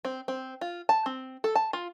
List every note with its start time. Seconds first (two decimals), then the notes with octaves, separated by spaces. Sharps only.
0.05 C4
0.28 C4
0.61 F4
0.89 A5
1.06 C4
1.44 A4
1.55 A5
1.73 F4